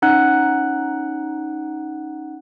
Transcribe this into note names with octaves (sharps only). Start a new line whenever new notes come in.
C#4 D#4 F#5 F#6